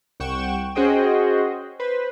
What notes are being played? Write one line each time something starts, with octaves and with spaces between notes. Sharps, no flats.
C2 F#5 G5 C#6 E7
C#4 F#4 G#4 C5 D#5 G5
B4 C5